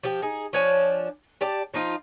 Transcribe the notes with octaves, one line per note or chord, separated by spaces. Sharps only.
F3 G4
D#4 G#4
F3 D4 C#5 G#5
G4 D5 A5
F3 D#4 F4